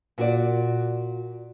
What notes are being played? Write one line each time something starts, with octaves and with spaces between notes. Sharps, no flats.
A#2 F#4 D5